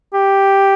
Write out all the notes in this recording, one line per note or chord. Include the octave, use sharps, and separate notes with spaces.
G4